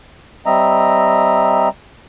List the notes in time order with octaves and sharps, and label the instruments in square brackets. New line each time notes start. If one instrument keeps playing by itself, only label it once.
[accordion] G3 C4 D#5 E5 A#5